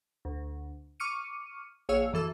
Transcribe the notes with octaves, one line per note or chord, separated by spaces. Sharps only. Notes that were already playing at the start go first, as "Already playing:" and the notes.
D2
C#6 D6 F6 C#7 D#7
A#1 G#4 C#5 F5 E6
F#2 E3 A4 E6